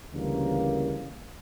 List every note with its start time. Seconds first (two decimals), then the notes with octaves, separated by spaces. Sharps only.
0.10 D2 C#3 E3 G3 A#3